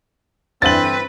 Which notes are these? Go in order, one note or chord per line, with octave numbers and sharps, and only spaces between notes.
G2 D3 E3 C4 B4 A6 F#7